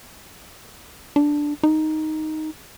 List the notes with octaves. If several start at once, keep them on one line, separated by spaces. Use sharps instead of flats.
D4
D#4